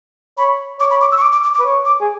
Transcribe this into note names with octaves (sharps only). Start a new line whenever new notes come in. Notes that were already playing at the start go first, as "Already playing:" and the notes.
C#5 B5
C#5 D6
B5
D6
E6
C#6
D6
D6
D6
D6
B4
C#5
D6
G#4